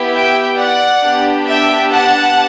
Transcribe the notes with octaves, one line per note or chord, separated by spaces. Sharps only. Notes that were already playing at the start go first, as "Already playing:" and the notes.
Already playing: B3 E4 G4
E5 G5
D5 F#5
B3 D4 G4
E5 G5
F#5 A5